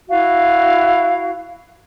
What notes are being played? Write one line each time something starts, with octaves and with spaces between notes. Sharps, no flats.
E4 F#4 F5